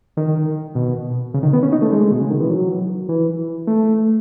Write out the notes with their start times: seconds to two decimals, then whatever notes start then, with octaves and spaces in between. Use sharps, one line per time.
0.17 D#3
0.75 B2
1.34 C#3
1.43 D#3
1.53 B3
1.63 C#4
1.72 D#4
1.82 A3
1.92 G#3
2.11 B2
2.21 C#3
2.30 D#3
2.40 E3
2.50 F#3
3.09 E3
3.67 A3